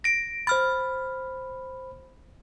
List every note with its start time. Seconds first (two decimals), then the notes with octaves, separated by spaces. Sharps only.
0.04 A#6 D7
0.47 C5 B5 F6 A6